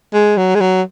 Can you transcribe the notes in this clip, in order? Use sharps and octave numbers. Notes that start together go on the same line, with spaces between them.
G#3
F#3
G#3
F#3